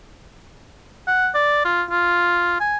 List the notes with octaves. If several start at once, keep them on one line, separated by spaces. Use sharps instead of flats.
F#5
D5
F4
F4
G#5